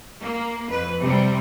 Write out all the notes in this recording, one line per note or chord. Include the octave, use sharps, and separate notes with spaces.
A#3
F2 B4
C3 G3